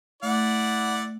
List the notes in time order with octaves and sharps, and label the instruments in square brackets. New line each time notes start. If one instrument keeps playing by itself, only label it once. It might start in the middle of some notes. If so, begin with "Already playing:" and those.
[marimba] A3 [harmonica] E4 D5 F#5